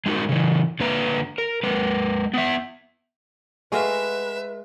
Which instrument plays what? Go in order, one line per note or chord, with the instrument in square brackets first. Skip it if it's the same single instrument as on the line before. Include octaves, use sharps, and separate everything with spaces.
[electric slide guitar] G#3 D#4 F#4 A#4
C#3 E3
D3 A#3 B4 A#5
A#4
G#3 A#4 B4
B3 E5
[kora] G#3 [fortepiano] A3 F#4 F5 [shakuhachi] B4 [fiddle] E5